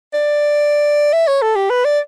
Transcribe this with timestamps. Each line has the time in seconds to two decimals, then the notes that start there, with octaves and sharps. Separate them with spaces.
0.14 D5
1.13 E5
1.28 C#5
1.42 A4
1.56 G4
1.70 B4
1.85 D5